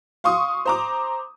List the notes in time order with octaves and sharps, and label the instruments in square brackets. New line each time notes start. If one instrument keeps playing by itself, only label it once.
[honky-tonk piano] F5 C6 C#6 D#6
C5 A#5 D6